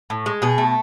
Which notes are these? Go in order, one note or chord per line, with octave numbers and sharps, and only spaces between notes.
A2
G#3
B2 G#4
A3